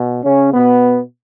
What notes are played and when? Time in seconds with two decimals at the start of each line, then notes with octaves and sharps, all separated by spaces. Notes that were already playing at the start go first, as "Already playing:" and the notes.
Already playing: B2
0.23 C#3 C#4
0.53 B2 B3